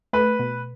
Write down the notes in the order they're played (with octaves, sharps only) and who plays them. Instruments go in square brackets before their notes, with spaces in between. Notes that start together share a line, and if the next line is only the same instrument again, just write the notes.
[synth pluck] A3 [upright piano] B4
[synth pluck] B2